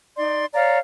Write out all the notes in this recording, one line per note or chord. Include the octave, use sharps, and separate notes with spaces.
D#4 D5 C6
C#5 D5 F5 A#5